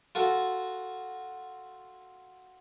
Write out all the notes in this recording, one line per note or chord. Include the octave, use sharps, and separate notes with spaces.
F4 F#4 A4